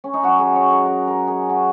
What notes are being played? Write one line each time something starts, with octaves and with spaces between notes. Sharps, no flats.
C#4
D#4
F#2 F#3 F#4
G#4
C#5
A#4
A#4
A#4
G#4
F#4